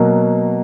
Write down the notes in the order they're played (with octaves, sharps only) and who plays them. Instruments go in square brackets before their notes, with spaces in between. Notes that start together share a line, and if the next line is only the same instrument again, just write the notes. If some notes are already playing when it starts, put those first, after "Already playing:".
Already playing: [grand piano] B2 F#3 A#3